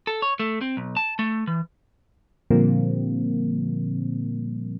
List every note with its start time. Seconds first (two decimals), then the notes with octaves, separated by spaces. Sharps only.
0.07 A4
0.22 C#5
0.40 A3
0.61 C4
0.77 B1
0.97 A5
1.19 A3
1.47 E3
2.50 A#2 D3 F3 G3 A#3 C4